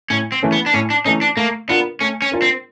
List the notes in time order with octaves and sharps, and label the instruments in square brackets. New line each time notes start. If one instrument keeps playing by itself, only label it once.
[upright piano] A2 [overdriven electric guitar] C#4
[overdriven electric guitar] C4
[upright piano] E3 A3 C#4
[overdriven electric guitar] B3
D4
[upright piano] A2 [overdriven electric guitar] C#4
[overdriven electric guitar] D4
[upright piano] E3 A3 C#4 [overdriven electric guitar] D#4
[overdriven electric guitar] D4
[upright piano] A3 [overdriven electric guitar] A#3
[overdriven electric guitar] B3 [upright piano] D4 F4 A#4
[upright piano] A3 [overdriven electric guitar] C#4
[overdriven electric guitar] C#4
[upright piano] D4 F4 A#4
[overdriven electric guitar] C4